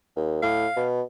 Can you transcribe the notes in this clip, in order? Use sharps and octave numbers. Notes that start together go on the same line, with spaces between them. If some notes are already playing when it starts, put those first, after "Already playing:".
D#2
A2 F5
B2